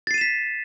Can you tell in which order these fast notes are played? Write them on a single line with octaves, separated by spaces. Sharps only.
A6 C7 D#7 E7 B6